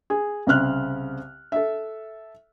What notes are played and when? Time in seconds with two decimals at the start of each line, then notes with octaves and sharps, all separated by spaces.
0.10 G#4
0.47 C2 C#3 C4 F6 F#6
1.52 A4 E5